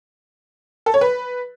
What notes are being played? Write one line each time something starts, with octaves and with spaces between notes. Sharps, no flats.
A4
C#5
B4